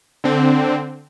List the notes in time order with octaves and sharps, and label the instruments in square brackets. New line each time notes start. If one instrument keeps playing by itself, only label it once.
[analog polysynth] D3 C4